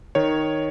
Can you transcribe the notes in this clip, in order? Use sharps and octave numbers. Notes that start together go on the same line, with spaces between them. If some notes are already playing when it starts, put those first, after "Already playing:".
D#3 C#5